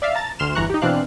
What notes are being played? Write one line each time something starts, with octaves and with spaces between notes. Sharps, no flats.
D5 E5 F5
A5 A#5 A6
D2 C6 F6 E7
G1 E2 A#5 C#6 F#6
D#4 G4
B2 E3 C4 D4 F5 F#6